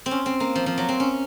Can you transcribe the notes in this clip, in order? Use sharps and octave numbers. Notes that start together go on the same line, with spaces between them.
C4
C#4
C4
A#3
F3
F3
F#3
C4
C#4